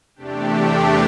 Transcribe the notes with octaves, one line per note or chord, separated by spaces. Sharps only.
E2 C3 A3 D4 G4